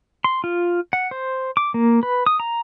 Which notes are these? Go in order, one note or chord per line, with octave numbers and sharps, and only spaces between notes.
C6
F4
F#5
C5
D6
A#3
B4
D#6
A#5